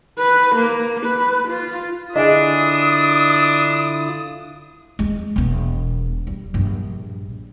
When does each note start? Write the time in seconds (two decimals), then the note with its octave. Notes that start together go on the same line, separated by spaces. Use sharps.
0.18 B4
0.55 A#3
1.06 B4
1.48 F4
2.16 D3 D4 E4 F4 G#4 D#5 D#6
4.99 G#3 C4
5.36 E1 B3
6.27 G3
6.54 A#1 G2